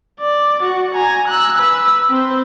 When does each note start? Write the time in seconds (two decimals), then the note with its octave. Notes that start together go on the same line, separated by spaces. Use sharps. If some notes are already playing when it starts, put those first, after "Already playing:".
0.20 D5
0.63 F#4
0.95 G#5 A#5
1.28 E6 F#6
1.58 B4 E6
2.09 C4 C5